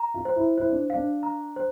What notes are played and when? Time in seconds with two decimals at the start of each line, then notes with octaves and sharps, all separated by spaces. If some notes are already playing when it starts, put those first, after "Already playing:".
Already playing: A#5
0.14 F4
0.25 C5
0.36 E4
0.58 E4 C5
0.69 D4
0.90 D4 F5
1.23 A#5
1.56 C5